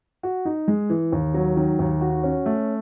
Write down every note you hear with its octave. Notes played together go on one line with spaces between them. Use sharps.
F#4
D#4
G#3
E3
D#2
F#3
D#3
D#2
F#4
C#4
A3